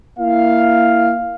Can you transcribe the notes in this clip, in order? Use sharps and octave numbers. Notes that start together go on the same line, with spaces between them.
A#3 E4 F5